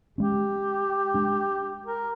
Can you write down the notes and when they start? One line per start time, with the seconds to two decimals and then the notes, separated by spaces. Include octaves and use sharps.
0.18 G#3 C#4 G4
1.14 G#3 D4
1.86 A#4